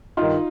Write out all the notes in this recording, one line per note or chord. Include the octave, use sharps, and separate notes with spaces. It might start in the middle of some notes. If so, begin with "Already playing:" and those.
G2 D#3 D#4 F4